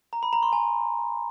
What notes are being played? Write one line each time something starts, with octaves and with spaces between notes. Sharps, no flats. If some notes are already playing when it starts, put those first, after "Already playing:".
A#5
B5
A#5
C6
G#5